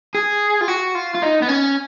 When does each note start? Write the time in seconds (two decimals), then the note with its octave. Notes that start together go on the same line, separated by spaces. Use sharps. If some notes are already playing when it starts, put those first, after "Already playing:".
0.15 G#4
0.61 F4
0.68 F#4
0.95 F4
1.15 F4
1.22 D#4
1.42 B3
1.49 C#4